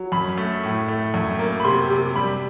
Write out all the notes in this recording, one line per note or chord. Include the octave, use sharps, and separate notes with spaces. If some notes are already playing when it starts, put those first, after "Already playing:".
Already playing: F#3
F#2 B5
A3
A2
A3
F#2
A#3
B5
C3 C6
C3
G3 B5